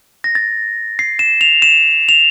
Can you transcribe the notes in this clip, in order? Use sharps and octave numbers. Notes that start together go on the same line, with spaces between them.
A#6
A6
C7
E7
F7
E7
F7